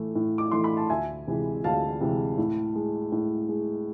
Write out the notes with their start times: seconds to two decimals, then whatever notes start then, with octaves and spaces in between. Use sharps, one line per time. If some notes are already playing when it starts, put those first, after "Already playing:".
Already playing: A2 E3 A3
0.15 A2
0.38 D6
0.52 E3 A3 C6
0.64 B5
0.77 A5
0.90 D2 E5 G#5
1.27 C3 E3 G#3
1.64 D2 F5 A5
2.01 C3 E3 G#3
2.38 A2
2.75 G#3
3.12 A2
3.49 G#3